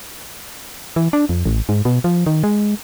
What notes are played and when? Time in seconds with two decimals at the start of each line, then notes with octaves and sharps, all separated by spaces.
0.96 E3
1.13 D4
1.29 F2
1.46 A1
1.69 G#2
1.85 B2
2.04 F3
2.26 D#3
2.44 G#3